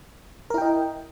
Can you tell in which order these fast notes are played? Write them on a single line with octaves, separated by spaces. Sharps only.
A#4 E4 G5 D#5